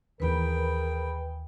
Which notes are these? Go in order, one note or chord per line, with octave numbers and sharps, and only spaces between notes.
D#2 E3 B3 G#4 A#4 B4 G5 B5